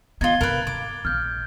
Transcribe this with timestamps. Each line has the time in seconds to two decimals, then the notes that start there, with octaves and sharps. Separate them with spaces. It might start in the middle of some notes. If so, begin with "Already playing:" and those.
0.21 G#3 B3 D#4 F4 G#6 A6 G7
0.41 G2 C3 A#4 B4
0.67 C3 D6
1.05 A#1 G#3 F6 G6